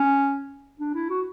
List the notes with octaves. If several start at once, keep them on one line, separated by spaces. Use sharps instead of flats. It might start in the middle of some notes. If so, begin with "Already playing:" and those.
Already playing: C#4
D4
E4
F#4